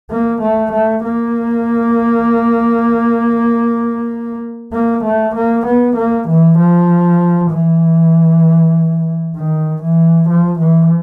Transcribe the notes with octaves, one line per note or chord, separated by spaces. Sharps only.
A#3
A3
A3
A#3
A#3
A3
A#3
B3
A#3
E3
F3
E3
D#3
E3
F3
E3